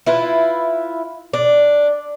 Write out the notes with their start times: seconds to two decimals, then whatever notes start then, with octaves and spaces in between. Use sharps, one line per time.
0.06 E4 F4 B4
1.33 D4